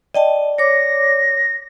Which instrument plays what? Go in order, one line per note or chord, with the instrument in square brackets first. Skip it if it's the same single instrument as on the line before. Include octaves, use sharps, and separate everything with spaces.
[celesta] D5 [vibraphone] D#5 G5 A5
[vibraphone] C#5 D6 [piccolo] A#6